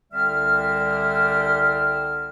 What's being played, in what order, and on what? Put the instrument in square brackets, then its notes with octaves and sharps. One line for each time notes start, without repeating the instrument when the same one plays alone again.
[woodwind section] C2 D3 G3 C4 E5 F6